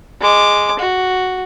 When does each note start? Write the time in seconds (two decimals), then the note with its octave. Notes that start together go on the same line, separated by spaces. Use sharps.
0.21 G#3 D6
0.80 F#4